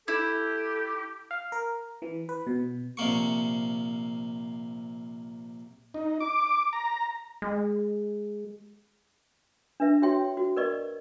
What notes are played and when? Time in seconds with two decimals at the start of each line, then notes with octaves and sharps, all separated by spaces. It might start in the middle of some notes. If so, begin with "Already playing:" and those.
0.08 E4 G4 A4
1.31 F5
1.52 A#4
2.02 E3
2.29 B4
2.47 B2
2.97 A#1 C3 A#3 C#6
5.94 D#4
6.20 D6
6.73 A#5
7.42 G#3
9.80 D4 B4 E5
10.02 F#4 C#5 E5 G5 C6
10.37 F#4
10.57 A#4 B4 D5 D#5 C#6